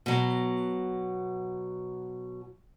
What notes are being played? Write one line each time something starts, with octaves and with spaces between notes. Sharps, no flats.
B2 F#3